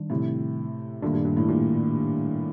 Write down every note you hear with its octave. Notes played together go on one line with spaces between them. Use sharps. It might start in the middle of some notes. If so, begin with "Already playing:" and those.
Already playing: D#3 G3 D4
A2 C3
G2 A#2 D#3 A3 D4
G2
G2
A2
G2 A#2